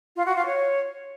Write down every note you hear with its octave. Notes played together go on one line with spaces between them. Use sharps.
F4
F#4
F4
C#5